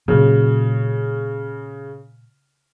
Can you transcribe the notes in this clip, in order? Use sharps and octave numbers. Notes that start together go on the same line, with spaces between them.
A#2 C#3 F#3